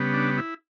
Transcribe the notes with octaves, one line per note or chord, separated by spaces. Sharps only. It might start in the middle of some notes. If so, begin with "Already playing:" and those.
Already playing: C#3 G3 B3
D4
E4